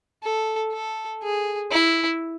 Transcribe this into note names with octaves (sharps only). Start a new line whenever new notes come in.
A4
A4
G#4
E4